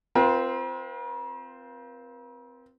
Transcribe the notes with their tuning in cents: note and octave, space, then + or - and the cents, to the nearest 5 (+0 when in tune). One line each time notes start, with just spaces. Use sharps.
C4 -10 F4 -5 A#4 +45